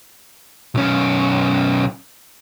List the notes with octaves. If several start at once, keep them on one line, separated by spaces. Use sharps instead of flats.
B1 C#4